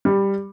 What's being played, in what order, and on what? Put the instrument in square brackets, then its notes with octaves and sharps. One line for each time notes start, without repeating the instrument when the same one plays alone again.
[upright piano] G3